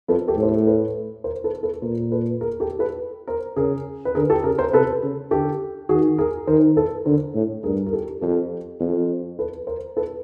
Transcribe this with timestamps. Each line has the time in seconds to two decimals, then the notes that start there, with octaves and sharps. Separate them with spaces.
0.08 F2 A4 B4
0.28 G4 A4
0.37 A2
0.43 C5
0.47 A4 B4
0.67 A4 B4
1.24 A#4 C5
1.44 A4 B4
1.63 A4 B4
1.82 A#2 A#4 C5
2.12 A4 B4
2.41 G#4 A#4
2.60 G4 A4
2.79 A4 B4
3.27 A#4 C5
3.56 C#3 G#4 A#4
4.05 B4
4.15 D3 G#4 A#4
4.30 G4 A4
4.44 C#3 G#4 A#4
4.58 A#4 C5
4.73 C3 A4 B4
5.03 C#3
5.31 D3 G4 A4
5.89 D#3 F#4 G#4
6.18 G#4 A#4
6.47 D#3 A#4 C5
6.77 A4 B4
7.05 D3 A#4 C5
7.35 A2
7.64 G2 G#4 A#4
7.86 A#4
7.93 G4 A4
8.21 F2 G4 A4
8.80 F2
9.39 A4 B4
9.67 A#4 C5
9.97 A4 B4